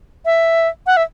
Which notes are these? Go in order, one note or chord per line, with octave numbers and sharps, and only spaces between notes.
E5
F#5
E5